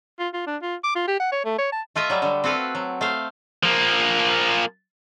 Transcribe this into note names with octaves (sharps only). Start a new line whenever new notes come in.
F4
F4
D4
F4
D6
F4
G4
F#5
C#5
A3
C#5
A5
A3 F4 D#5 E5
F#3 G3
D3 G3
C4 F#4 A4 B4 F5
F#3
A3 C5 F5
F3 A#3